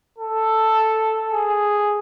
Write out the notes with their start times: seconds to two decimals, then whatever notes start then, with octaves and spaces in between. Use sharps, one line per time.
0.18 A4
1.33 G#4